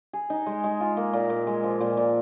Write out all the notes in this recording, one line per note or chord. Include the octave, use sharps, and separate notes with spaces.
G#4
D#4
G#3
G#3
F4
A#3
A#2
A#2
G#3
F3
A#2
A#2